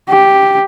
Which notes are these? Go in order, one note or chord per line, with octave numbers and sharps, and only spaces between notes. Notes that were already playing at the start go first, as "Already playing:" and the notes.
G4